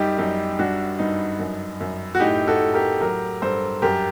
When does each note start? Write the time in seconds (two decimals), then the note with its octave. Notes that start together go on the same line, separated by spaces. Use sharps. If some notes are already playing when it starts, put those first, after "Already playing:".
Already playing: F#2 G3 D#4 G4
0.18 F#2 D#4
0.59 G3 D4 F#4
0.99 G2 D#4
1.40 F#2
1.81 F#2
2.15 F#4
2.20 A2 D#4 G4
2.47 F#4 A4
2.61 A2
2.74 G4 A#4
3.01 F#3 G4 A#4
3.42 G2 A4 C5
3.82 F#2 G4 A#4